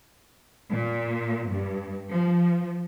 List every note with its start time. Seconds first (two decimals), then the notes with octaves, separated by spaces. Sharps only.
0.71 A#2
1.49 G2
2.10 F3